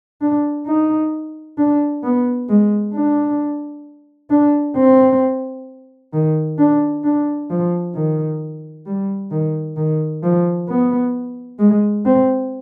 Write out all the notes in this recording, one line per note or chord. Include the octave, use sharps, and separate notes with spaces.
D4
D#4
D4
B3
G#3
D4
D4
C4
D#3
D4
D4
F3
D#3
G3
D#3
D#3
F3
B3
G#3
C4